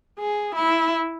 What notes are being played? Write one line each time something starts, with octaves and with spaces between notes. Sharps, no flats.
G#4
E4